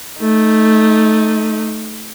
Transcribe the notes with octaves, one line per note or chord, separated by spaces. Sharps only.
A3 D#4